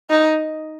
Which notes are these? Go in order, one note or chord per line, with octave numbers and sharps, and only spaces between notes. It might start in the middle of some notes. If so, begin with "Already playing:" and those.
D#4